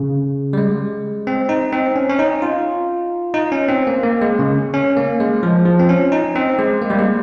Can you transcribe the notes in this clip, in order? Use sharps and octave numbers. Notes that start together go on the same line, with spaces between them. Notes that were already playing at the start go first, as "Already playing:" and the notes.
Already playing: C#3
G3
G#3
C4
D#4
C4
C#4
C#4
D#4
F4
D#4
C#4
C4
A#3
A#3
G#3
C#3
C#4
A#3
G#3
F3
F3
C4
C#4
D#4
C4
G#3
A#3
G3
G#3